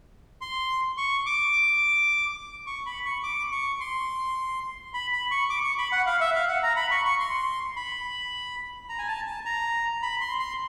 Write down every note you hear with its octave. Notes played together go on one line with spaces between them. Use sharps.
C6
C#6
D6
C#6
B5
C#6
D6
C#6
C6
B5
B5
C#6
D6
C#6
B5
F#5
F5
E5
F5
F#5
A#5
B5
C#6
C#6
C6
B5
A#5
G#5
A5
A5
A#5
B5
C6
C6